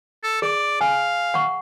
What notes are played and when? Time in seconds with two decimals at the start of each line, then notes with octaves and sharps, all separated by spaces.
0.24 A4
0.42 G#4 D5
0.81 F5 G#5
1.34 F#5 C#6